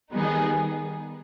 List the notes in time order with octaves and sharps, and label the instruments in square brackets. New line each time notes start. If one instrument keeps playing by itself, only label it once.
[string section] D#3 G3 B3 D#4 G#4